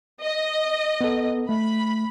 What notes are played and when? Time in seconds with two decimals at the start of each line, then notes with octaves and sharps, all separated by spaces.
0.23 D#5
1.01 B3 A4
1.49 A3 B5